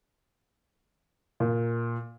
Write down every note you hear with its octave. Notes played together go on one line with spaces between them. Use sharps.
A#2